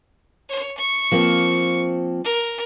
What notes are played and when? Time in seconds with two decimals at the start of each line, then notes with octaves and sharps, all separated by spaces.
0.49 C#5
0.77 C#6
1.12 F3 A#3 C4
2.24 A#4